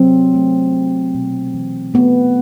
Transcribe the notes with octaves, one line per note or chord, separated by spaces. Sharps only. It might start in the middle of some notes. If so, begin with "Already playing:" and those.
Already playing: F#3 C4
A3
A3
B2
E3
A3 B3